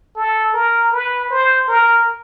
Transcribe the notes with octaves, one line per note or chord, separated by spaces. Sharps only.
A4
A#4
B4
C5
A#4